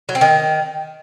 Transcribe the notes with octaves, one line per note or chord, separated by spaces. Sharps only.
F#3
C4
D#3